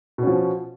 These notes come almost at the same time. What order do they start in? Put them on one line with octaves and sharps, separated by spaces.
B2 C#4 F3